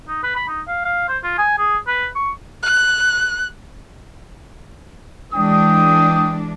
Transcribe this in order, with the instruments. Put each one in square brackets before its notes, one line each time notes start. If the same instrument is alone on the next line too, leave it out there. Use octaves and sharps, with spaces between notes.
[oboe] D#4
B4
B5
D#4
F5
F5
C5
F4
G#5
G#4
B4
C#6
[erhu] F#6
[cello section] E3 G#3 D4 [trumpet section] G5 D#6